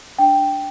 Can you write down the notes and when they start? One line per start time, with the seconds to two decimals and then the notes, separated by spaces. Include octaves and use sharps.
0.19 D4 G5